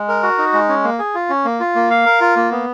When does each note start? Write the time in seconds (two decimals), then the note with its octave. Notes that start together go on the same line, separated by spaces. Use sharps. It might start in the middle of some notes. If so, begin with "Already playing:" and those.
Already playing: G#3
0.08 A#4
0.23 F#4
0.38 D#4
0.53 G#3
0.69 C#4
0.84 A#3
0.99 G#4
1.15 F4
1.30 C#4
1.45 A#3
1.60 F4
1.75 A#3
1.90 F5
2.06 A#4
2.21 F4
2.36 A#3
2.51 B3